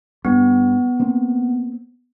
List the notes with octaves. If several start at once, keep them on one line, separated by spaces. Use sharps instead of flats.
G2 B3
A#3 C4